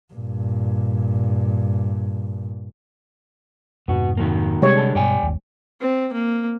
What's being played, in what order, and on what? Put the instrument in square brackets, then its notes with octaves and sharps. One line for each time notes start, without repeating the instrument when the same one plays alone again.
[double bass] G2 A#2
[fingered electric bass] F2 G#2 C3 [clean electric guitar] B3 F#4
[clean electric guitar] D#3 F#3 A#3
[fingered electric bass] C3 [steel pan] G3 G#3 C#5
[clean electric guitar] D3 G#4 A5
[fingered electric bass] G2 B2 [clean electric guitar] D5 G5 G#5
[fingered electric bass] G1 D#2
[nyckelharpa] C4
A#3